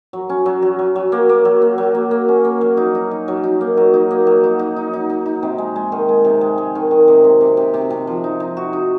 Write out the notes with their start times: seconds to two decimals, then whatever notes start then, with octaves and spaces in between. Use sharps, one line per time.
0.13 F#3
0.29 C#4
0.46 F#3
0.62 F#3
0.79 F#3
0.96 F#3
1.12 A#3
1.29 A#3
1.45 F#3
1.62 A#3
1.78 F#3
1.95 A#3
2.11 A#3
2.29 C#4
2.45 A#3
2.61 F#3
2.77 D#4
2.95 D#4
3.11 D#4
3.28 F#3
3.44 D#4
3.61 A#3
3.77 F#3
3.94 D#4
4.11 A#3
4.27 F#3
4.44 D#4
4.59 D#4
4.76 D#4
4.93 D#4
5.10 D#4
5.26 D#4
5.43 C3
5.58 G#3
5.76 G#3
5.92 D#3
6.09 G#3
6.25 C3
6.41 G#3
6.58 G#3
6.75 D#3
6.91 D#3
7.08 C3
7.24 C3
7.41 C3
7.57 C3
7.74 C3
7.90 C3
8.07 F3
8.24 D#4
8.40 D#4
8.57 F#4
8.73 D#4